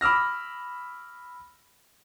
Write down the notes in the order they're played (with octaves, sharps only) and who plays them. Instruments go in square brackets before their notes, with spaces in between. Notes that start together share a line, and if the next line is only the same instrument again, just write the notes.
[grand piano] B5 D6 E6 F6 A#6